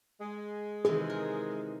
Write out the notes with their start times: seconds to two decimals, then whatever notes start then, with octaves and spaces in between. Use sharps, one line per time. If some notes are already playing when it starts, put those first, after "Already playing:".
0.21 G#3
0.85 C3 D#3 E3 G#4
1.10 A#4